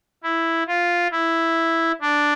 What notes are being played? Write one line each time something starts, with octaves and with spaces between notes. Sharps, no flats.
E4
F4
E4
D4